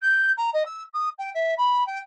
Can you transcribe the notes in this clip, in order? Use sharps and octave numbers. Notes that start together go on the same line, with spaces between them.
G6
A#5
D#5
E6
D#6
G5
E5
B5
G5